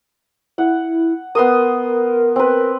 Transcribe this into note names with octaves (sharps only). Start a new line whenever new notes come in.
E4 F#5
B3 A#4 C6 D#6
C4 B4